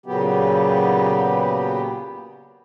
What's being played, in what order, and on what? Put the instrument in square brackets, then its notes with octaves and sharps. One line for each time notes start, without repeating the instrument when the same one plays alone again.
[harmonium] A#2 C#3 F#3 B3 G4